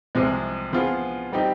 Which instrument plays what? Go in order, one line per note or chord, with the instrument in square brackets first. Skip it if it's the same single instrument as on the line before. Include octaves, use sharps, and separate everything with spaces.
[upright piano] C2 C3 F3 G#3
F3 B3 F4 G#4
G3 C4 D#4 G4